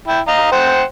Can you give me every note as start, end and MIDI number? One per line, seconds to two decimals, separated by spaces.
0.08 0.20 64
0.08 0.20 79
0.28 0.47 75
0.28 0.47 77
0.28 0.47 82
0.52 0.83 72
0.52 0.83 78
0.52 0.83 79